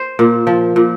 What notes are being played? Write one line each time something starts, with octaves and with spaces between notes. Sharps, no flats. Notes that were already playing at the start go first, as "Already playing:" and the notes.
Already playing: C5
A#2
F3
A#2